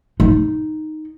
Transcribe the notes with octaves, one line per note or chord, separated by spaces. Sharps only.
D#4